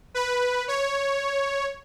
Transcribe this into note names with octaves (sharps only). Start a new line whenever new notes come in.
B4
C#5